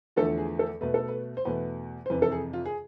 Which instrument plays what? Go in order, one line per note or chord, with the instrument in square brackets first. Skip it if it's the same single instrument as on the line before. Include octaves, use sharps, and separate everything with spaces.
[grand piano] E2 D3 F3 A3 A4
G#4
A4
B2 A3 B4
A4
B4
C5
E2 B2 A3 B4
C5
F2 C3 E3 B4
A4
G#4
F4
G#4